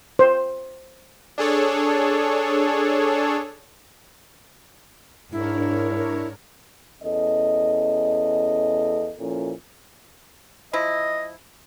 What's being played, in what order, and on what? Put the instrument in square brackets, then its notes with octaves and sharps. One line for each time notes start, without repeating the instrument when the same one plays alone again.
[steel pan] C5
[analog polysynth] D4 G#4 A4 C#5
[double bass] G#2 [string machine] D4 A#4 C#5 [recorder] E4
[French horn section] E2 C#4 A4 D#5
A#2 F3 C#4 E4 A4
[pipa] F3 E4 [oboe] D#5